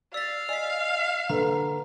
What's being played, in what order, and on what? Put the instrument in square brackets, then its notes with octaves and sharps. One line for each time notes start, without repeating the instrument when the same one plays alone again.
[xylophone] D5 A6 [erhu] F5 [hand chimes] E6 B6
[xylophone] D5 B6 [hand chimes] D#5 G#5
[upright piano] D3 [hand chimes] A#3 B4 [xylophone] A#5